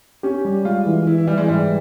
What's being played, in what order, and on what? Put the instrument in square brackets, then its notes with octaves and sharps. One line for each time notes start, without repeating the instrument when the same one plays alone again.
[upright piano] C#4 [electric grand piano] G4
[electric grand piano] G3
[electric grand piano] G#3 [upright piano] F4
[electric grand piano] E3
[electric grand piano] E3 [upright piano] E4
[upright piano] E4
[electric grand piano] E3 [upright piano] G3
[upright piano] G#3
[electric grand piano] G#2 [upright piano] G3